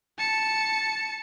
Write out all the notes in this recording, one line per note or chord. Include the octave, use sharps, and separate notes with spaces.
A5 C#7